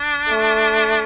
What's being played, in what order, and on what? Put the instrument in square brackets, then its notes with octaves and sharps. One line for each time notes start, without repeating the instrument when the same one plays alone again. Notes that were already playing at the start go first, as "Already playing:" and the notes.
Already playing: [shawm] D4
[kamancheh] A3